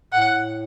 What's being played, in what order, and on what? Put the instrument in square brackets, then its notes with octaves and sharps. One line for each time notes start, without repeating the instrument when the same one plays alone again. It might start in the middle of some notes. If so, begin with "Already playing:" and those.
[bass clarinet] A2 [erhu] F#5